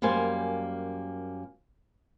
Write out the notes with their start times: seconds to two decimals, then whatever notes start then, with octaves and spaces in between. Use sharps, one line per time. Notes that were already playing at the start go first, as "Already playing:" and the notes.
0.02 F#2 G3 A#3 C5 G#5